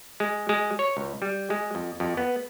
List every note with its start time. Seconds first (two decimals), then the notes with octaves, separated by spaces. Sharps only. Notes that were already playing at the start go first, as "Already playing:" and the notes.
0.20 G#3
0.49 G#3
0.79 C#5
0.97 C#2
1.22 G3
1.50 G#3
1.75 F2
2.00 F2
2.17 B3